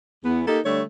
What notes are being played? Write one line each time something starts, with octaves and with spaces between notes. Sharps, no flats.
E2 B3
A#3 D#4 G4 A4
D3 G3 A3 C#5